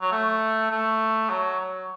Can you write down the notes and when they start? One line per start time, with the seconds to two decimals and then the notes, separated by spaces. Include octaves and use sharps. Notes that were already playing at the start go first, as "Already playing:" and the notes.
0.01 F#3
0.12 A3
0.71 A3
1.30 F#3
1.60 F#3